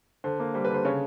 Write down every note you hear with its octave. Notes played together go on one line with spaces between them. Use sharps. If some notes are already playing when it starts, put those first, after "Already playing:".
D3 C5
A#3
G3 C5
B4
D3 C5
C#3 C#5